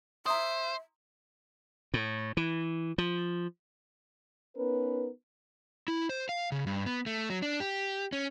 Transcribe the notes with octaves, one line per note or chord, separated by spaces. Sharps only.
C5 E5 A#5 C6 D#6
A2
E3
F3
B3 C#4 D#4 A#4 B4
E4
C5
F5
C#3
G2
B3
A3
F#3
D4
G4
C#4